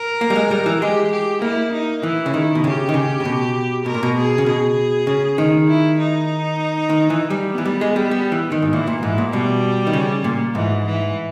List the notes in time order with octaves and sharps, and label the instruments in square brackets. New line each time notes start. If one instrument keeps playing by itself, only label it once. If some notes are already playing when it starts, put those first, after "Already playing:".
Already playing: [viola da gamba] A#4
[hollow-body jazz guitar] A#3
G3
G#3
G3
E3
[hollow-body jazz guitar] G#3 [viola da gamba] G4
[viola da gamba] G4
[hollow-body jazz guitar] A#3 [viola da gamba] E4
[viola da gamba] D#4
[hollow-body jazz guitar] E3 [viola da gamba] E4
[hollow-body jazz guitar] C#3
D#3
B2
[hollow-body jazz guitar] C#3 [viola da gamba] G4
[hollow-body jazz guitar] D#3
C#3
C#3
B2
[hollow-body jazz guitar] B2 [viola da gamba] A#4
[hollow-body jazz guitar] A#2
B2
[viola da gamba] G#4
[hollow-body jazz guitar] C#3
[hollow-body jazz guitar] B2 [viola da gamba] G#4
[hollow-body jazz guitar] C#3
D#3
[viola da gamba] E4
D#4
[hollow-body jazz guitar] D#3
E3
G3
[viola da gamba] B3
[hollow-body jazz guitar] E3
G3
G#3
G3
G3
E3
D#3
G#2
[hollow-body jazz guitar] A#2 [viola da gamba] E3
[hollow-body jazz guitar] A#2
[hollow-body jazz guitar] G#2 [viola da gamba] E3
[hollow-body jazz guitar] A#2
[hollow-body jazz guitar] B2 [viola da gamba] G3
[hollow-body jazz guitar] D#3
C#3
A#2
[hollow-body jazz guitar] G#2 [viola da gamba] E3
[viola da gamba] E3